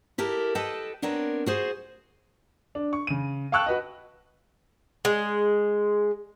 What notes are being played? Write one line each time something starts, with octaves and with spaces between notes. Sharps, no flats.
E4 G4 A4 A#4
A4 B4 D#5 G5 A5
B3 C4 D4 A#4 B4 C#5
F#4 G#4 C5
D4
C#6
C#3 D#7
F5 G5 A5 C#6 E6 F#6
F#4 B4 D#5
G#3